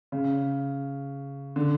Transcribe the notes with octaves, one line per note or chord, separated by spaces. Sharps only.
C#3
D3